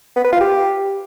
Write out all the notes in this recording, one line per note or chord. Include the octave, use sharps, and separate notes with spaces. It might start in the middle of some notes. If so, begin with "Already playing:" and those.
B3
B4
F4
G4